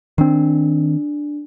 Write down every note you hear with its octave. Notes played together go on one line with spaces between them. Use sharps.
D#3 C4 D4